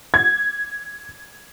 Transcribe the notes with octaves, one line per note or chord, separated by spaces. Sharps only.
G#6